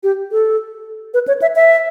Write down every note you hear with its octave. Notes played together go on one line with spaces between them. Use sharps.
G4
A4
B4
C#5
E5
E5